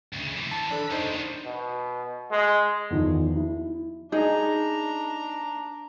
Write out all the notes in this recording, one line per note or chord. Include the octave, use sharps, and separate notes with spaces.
D2 C#3
E3 F3
A5
D4 A4 B5
E2 C#3 D4 D#4 C5
A2 D#3
B2
G#3
E2 D#3 F3
E4
D4 D#4 G#4 A#5